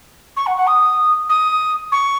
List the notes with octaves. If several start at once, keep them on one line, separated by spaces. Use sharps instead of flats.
C#6
F#5
F#5
D#6
D#6
C#6